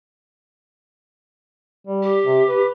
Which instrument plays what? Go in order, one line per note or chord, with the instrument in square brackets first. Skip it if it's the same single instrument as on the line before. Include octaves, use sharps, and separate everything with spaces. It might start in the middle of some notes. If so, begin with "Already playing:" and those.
[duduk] G3
[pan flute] G4
[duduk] C3
B4